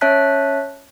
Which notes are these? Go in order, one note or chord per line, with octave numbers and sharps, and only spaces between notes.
C#4 C#5 E5 A5 F#6 B6